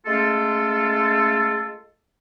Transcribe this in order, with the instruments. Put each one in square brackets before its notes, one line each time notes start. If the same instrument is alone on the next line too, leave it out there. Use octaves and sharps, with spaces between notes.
[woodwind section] G#3 A3 C#4 F4 A4